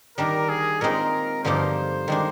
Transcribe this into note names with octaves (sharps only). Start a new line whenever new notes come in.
D#3 G3 D4 A#4
G#4
A#2 G#3 C4 D#4 A#4
G2 D3 F3 A#3 D#4 C5
D#3 G#3 D4